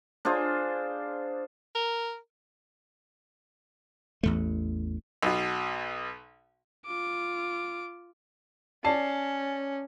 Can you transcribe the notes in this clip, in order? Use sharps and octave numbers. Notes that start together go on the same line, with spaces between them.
D4 F4 G#4 C5
A#4
A1 E2 A3
B1 B2
F4 D6
C#4 D5 A5 C7